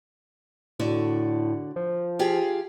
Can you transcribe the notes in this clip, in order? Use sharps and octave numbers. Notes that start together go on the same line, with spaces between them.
A2 D3 F#4 D5
F3
F4 G4 G#4